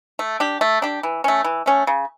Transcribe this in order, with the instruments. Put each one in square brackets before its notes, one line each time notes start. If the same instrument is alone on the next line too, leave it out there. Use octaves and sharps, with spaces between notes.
[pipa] A3
D4 G4
A3
D4 G4
E3
A3 C#4
E3
A3 C#4
C#3